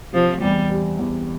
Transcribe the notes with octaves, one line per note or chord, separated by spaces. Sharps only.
C3 F3
E2 G3
G3
E2